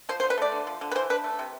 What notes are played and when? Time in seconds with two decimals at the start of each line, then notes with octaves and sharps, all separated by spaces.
0.09 F3 C5
0.20 C5
0.23 D3
0.30 B4
0.38 A3 D5
0.52 D3
0.67 F3
0.81 D3
0.91 B4
0.95 E3 C5
1.10 D4 B4
1.24 A3
1.39 C3